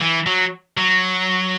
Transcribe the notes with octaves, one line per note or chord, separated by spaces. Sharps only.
E3
F#3
F#3